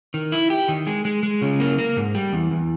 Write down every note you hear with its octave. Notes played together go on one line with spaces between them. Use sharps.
D#3
E4
G4
D#3
G#3
G#3
G#3
C#3
A#3
A#3
G#2
G3
E2
E2